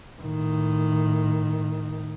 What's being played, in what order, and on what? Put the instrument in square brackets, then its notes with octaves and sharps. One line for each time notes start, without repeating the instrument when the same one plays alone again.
[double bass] A2 D#3